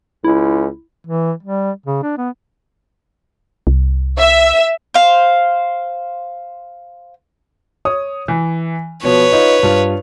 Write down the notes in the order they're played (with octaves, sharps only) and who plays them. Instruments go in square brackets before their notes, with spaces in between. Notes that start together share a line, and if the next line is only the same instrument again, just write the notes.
[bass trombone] C#2 [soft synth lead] E4
[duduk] E3
G3
C#3
D4
B3
[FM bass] C2
[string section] E5
[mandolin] C5 F5
[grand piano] C#5 D#6
E3
[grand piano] B2 F3 [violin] B4 C#5
[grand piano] D#4 F4
G2 F4 F7